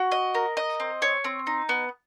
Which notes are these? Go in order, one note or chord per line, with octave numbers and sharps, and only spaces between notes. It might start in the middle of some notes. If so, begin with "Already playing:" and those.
Already playing: F#4
D#5
A#4
D#5
C4
C#5
C4
D#4
B3